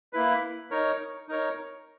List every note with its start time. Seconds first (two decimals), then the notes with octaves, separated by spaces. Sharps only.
0.13 A#3 E4 B4
0.71 D#4 A#4 C#5
1.29 D#4 A#4 C#5